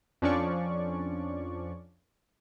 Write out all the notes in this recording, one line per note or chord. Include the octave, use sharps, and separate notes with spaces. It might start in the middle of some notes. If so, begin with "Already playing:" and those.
F2 F3 C#4 D4 D5 C#6